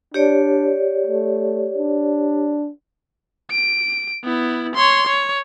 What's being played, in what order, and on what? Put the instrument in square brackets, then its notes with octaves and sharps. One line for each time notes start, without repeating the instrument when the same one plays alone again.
[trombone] D4 [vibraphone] G4 C#5 D5
[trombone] A3
D4
[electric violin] D7
B3 E4
C#5 C6
C#5